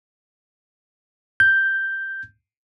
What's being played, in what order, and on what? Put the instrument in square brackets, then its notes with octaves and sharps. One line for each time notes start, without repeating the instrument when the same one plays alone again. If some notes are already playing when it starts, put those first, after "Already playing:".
[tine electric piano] G6